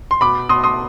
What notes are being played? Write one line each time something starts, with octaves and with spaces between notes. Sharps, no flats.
C6
B2 B5 D6
B2 C6 D#6
C6 D#6